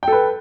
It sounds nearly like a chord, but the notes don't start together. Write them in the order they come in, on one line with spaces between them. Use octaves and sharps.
G5 A4 B4